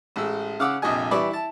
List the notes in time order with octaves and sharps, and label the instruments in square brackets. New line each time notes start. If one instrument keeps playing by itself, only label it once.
[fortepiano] A1 G#3 E6
C#3 F5 F#5 D6 E6
A#1 F2 C3 G4 D#5 G#5
E3 G3 E4 D5 B5 C#6
E4 A5